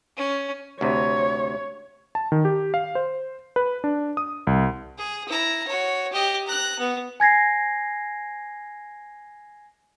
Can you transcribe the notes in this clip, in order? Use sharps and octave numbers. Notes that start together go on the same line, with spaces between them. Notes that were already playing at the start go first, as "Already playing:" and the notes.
C#4
D2 C3 C#5
A5
D#3
G4
F5
C5
B4
D4
D#6
C2
G#4
E4 A#5
F#4 C#5
G4 D#5
A#5 F#6
B3
G#5 G#6 A#6 C7